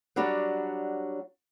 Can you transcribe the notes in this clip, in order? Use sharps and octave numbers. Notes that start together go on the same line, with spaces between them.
F#3 G3 D4 F#4 C#5